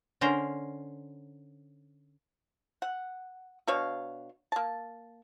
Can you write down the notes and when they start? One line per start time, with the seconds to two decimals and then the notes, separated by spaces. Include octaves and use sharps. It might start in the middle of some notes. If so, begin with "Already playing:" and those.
0.21 D3 C#4 A#4 C5 A#5
2.82 F#5
3.67 B2 D4 C#5 F5
4.52 A#3 A5